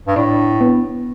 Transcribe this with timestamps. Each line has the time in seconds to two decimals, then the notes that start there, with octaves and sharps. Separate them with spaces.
0.07 G2
0.16 A2 D4
0.61 B3